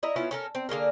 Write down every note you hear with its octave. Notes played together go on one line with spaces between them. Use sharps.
E4 D#5 E5 A#5
B3 C#4 E4 F4
C#4 A4 A#4
C4
D3 A#3 G#4 A#4